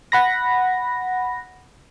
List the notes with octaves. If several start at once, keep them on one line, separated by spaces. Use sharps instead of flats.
F#5 B5 A#6